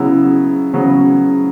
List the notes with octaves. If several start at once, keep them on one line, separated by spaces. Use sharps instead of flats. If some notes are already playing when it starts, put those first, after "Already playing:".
Already playing: C#3 F#3 B3 E4
C#3 F#3 B3